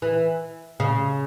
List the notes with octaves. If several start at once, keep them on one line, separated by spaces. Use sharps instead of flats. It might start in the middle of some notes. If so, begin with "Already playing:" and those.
E3
C#3